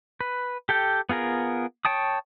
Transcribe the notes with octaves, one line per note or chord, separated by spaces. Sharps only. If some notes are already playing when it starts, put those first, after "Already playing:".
B4
G4 A4 G5
B3 F4 G#4 A#4
C#5 G5 A5 D#6